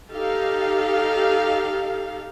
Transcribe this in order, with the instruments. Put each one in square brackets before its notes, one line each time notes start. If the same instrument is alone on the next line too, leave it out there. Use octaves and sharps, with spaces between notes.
[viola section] D#4 G4 A4 F5